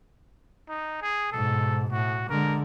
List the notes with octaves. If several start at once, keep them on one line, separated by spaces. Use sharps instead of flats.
D#4
G#4
G#2 B2 A4
A2 F#4
D3 G#3 A#4